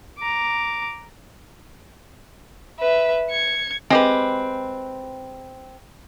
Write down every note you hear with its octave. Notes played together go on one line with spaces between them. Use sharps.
A#5 D6
B4 E5
G#6 C#7
G#3 C4 G4 B4